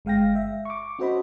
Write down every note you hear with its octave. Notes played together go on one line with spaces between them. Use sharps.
G1 G#3 F5 G5 A#6
E5
C#6 D6
C#4 F#4 A4 C5 D#5 B5